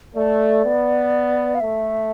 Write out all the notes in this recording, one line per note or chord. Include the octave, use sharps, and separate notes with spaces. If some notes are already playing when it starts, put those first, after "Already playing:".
A3 D5
B3
F5
A3 E5